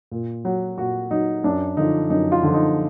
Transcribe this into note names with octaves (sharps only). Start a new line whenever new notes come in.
A#2
F#3
A#2 F#4
F#3 D#4
F#2 D4
D3 F3 D#4
F#2 D#4
F4
D3 F3
D#4